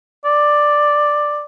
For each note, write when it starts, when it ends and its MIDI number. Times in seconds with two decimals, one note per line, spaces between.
0.25 1.44 74